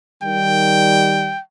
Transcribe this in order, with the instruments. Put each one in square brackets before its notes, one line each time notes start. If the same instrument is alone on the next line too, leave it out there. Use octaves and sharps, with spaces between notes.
[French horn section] D#3 G3 [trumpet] G5